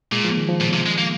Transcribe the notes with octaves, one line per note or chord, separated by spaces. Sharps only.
A#2 G#3
F3
D#3
F3
A#2
C3
G#3
A#3